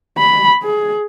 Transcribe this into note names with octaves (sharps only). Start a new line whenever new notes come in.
B5
G#4